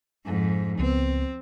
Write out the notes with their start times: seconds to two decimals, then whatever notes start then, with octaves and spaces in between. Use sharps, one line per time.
0.24 F2 G#2
0.79 C#2 B3 C4